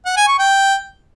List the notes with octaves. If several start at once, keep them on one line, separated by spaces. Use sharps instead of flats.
F#5
G#5
C#6
G5